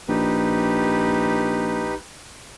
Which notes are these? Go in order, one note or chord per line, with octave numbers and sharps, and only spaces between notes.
A#1 D#4 G4 B4